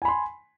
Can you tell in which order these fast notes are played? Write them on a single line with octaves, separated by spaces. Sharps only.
G#5 B5 C6